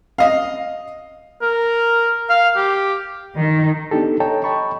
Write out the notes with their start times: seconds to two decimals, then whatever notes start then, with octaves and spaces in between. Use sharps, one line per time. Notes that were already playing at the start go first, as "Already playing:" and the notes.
0.18 D#5 F5
1.42 A#4
2.30 F5
2.56 G4
3.36 D#3
3.91 B3 D4 D#4 G4 A4
4.20 A4 C#5 D#5 G5 A5 A#5
4.44 D#5 G5 A5 B5 C#6